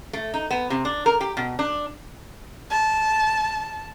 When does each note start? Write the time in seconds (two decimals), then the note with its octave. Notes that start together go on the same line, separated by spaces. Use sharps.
0.13 A3
0.34 D#4
0.51 B3
0.70 C3
0.85 D4
1.06 A#4
1.21 G4
1.37 B2
1.59 D4
2.70 A5